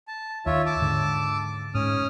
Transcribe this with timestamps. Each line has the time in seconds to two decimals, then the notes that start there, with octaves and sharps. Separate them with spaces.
0.08 A5
0.46 D#2 F4 C#5 E5
0.66 A5 D6 E6
0.81 G#2 D3
1.74 G#2 C#4 D#6 F6